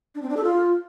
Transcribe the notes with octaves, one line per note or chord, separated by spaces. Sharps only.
D4
C4
D4
A4
F4